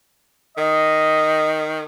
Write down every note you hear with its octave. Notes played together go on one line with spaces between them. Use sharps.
D#3 D#5